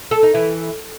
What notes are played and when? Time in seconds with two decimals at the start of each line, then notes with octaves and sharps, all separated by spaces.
0.11 A4
0.23 D#4
0.34 E3